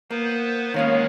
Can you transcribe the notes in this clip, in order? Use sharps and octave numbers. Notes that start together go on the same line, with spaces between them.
A#3 B3 B4 C5
D#3 G#3 A#3 B3 C#4 C#5 F5